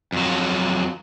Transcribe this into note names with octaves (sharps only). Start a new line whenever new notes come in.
F2 F#3